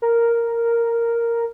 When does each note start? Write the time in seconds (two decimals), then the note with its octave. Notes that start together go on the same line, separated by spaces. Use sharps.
0.02 A#4